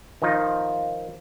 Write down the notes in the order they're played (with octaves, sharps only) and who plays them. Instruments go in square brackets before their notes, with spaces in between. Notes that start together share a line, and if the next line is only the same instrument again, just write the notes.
[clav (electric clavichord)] D#3 F3 D#4 F4